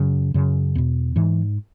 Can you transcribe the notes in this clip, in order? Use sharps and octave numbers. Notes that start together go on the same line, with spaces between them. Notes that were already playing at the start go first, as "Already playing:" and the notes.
Already playing: F#2 C#3 F#3
F#2 C#3
E2 B2
G#2 E3